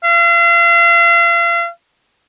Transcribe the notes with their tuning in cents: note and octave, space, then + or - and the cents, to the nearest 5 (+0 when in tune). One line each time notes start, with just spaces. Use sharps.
F5 -40